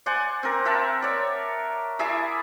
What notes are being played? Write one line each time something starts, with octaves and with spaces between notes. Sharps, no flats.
C5 D5 F#5 G#5
C4 A#4
A#4 E5 F#5 A5
C#5 D5
E4 G#4 D5 E5